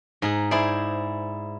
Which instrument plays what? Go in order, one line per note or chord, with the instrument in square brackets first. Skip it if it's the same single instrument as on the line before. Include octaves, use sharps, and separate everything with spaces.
[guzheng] G#2 G#4
E4 G#4 C5 D5